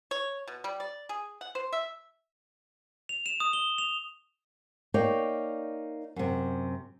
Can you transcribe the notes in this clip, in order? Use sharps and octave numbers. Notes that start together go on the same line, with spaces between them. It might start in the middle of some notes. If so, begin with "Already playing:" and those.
C#5
B2
G3
D5
G#4
F#5
C5
E5
F7
E7
D#6
G7
F7
A#3 D#4 C#5 D5 G5
F#2 C3